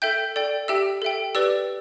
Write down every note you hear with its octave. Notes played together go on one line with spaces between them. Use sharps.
A4 E5 G5 G6
A4 D5 G5
G4 E5 G5 E6
A4 E5 G5
G4 B4 D5 E6